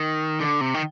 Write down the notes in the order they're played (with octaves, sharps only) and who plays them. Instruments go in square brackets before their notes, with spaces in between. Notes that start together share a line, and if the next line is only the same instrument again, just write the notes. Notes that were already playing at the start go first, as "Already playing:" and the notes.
Already playing: [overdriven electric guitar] D#3
D3
C3
D#3